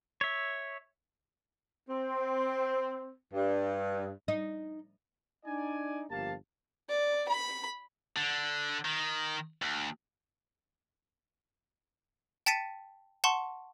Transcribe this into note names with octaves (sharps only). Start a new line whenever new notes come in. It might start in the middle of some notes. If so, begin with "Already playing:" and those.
C#5 E5
C4
G2
D#4
D4 D#4 D5 G#5
G1 F3 A#3 G4 F5 A5
D5
B5
D3
D#3
D2
G5 A5 A6 B6 C#7 D#7
F#5 A5 C6 C#6